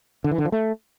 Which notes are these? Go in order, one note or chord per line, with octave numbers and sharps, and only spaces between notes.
D3
E3
D3
F3
A3